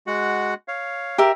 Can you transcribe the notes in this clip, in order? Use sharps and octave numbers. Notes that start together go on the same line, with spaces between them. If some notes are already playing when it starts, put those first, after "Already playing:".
G#3 F#4 F#5
C#5 F5
G4 A#4 E5